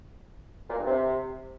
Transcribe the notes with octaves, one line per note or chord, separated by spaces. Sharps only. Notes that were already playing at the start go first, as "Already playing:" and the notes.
A#2
G2
C3